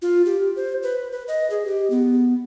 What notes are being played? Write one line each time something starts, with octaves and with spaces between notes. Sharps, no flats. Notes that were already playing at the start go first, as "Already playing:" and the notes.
F4
G4
C5
B4
B4
D#5
G#4
G4
B3